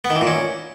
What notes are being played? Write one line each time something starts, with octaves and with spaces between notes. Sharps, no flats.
B3
D#3
E3
A#2
C#4